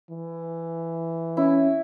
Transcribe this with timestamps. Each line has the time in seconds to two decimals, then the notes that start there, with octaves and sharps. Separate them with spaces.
0.11 E3
1.37 C#4 E4